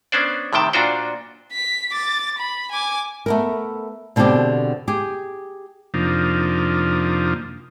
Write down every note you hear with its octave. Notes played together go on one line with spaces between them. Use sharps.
B3 C#4 D4 C5 D5
A2 C3 D#3 G5 A5
A#2 D4 F4 F#4 C5 G5
B6
D6 A6
B5
G#5 D6
A3 B3 A#4
B2 D3 C4 E4 G4 G#4
G4 G#4
F2 C3 F3 A#3 D4 D#4